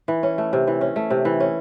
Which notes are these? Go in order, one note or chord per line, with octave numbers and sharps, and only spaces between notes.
E3
C#4
A3
C3
E3
C#4
A3
C3
E3
C#4